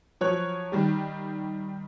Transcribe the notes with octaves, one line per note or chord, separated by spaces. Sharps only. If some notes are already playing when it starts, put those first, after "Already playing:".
F3 F#3 C#5 F#6
D#3 G3 G4